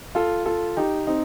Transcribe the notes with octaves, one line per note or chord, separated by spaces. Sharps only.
F4 A4
F4 A4
D#4 G4
C4 D#4